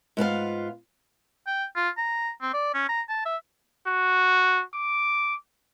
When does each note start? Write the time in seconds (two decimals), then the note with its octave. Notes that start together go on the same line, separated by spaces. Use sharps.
0.17 G#2 B3 F4 F5
1.47 G5
1.76 F4
1.97 A#5
2.42 C4
2.54 D5
2.74 C#4
2.89 A#5
3.09 A5
3.25 E5
3.87 F#4
4.74 D6